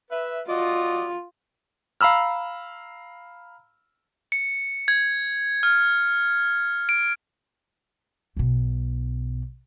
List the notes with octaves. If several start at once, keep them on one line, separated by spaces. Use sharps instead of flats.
B4 E5
F4 F#4 D5 D#5
F5 A#5 B5 E6 F6
C#7
G#6
F6
D7
B1 B2